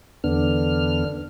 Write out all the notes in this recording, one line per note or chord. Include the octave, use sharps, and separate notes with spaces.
E2 D3 B3 D4 F6